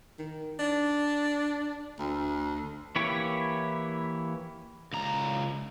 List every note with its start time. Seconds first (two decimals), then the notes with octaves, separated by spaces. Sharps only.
0.19 D#3
0.59 D4
1.98 D2
2.96 E3 A#3 E4 G4 C#5
4.93 C#2 A#5